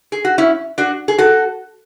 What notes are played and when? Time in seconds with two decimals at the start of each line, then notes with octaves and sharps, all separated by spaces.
0.12 G#4
0.25 F#4
0.38 C#4 E4
0.78 D4 F#4
1.08 G#4
1.18 F#4 A4